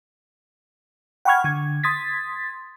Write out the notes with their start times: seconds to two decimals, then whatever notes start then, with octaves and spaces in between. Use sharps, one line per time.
1.25 F#5 G5 B5 C#6 F6 G#6
1.44 D3 G#6
1.83 C6 D#6 G#6 A6 B6